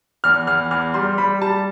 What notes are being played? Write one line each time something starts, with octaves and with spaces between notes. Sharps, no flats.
E2 F6
E2 F6
E2 F6
G3 C6
G3 B5
G3 A5